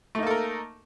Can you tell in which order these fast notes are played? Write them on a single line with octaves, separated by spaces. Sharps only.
A3 D#4 A#3 A4 A#4